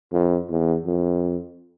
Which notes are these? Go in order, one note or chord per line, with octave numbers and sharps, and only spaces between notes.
F2
E2
F2